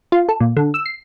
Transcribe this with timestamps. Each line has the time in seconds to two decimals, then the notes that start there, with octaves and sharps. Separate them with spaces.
0.12 F4
0.29 A4
0.40 A#2
0.57 D3
0.74 E6
0.86 C7